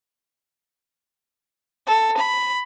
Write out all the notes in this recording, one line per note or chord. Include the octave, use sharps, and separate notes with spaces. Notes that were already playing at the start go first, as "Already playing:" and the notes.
A4
B5